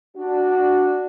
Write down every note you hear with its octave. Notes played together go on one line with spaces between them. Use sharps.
D4 F#4